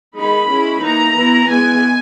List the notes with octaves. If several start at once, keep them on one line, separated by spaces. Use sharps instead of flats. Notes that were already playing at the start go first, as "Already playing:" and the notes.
D#3 G#3 D#4 B5
G#3 C#4 E4
E3 A#3 D#4 A#5
E3 B3 E4
E3 G#3 B3 G#5